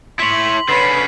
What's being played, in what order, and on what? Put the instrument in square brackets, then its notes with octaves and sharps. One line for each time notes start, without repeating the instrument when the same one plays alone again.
[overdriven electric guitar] E4 C#5 [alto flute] C6 [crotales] B6 F#7
[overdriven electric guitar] D3 C#4 [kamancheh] B4 B5 [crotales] A6 C7